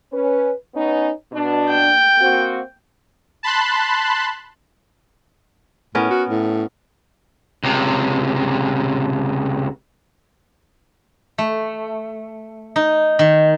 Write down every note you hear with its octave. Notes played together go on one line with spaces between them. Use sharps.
C#4 B4
B3 C#4 D#4
B2 D4
G5
A#3 C4 F#4
A5 B5 C6 F#6
A2 B3 C#4 A#4
F#4
A2
C#2 C3
A3
D#4
D#3